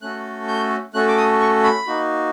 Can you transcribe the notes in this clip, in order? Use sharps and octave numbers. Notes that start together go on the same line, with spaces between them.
A3 C#4 F#4 A4 F#6
G6
A3 C#4 F#4 A4 F#6
D6
D#6
C#6
B5
A#3 D#4 F#4